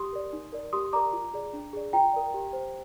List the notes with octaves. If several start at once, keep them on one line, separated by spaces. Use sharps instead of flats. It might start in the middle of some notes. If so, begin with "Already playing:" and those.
Already playing: G4 C6 D#6
A#4 D5
D#4
A#4 D5
G4 C6 D#6
A#4 D5 A#5 D6
F4
G#4 D5
D4
G#4 D5
F4 G5 A#5
A#4 D5
G4
C5